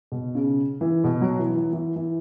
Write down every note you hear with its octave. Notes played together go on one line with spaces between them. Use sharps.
B2
C#3
E3
B2
F#3
E3
E3
E3
E3